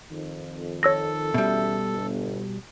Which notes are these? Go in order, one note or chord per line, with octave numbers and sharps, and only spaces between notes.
F2 D#3
A4 C#5 E6 A#6
E2 B2 G3 C#4 E5
G1